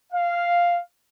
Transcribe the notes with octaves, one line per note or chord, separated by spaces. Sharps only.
F5